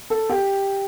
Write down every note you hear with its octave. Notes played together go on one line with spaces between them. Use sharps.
A4
G4